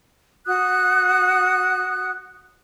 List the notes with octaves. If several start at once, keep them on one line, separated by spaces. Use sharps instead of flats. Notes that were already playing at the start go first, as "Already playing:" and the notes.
F#4 D#6 F#6